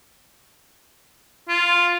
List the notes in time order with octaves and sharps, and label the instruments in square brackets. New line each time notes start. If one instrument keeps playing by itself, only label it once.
[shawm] F4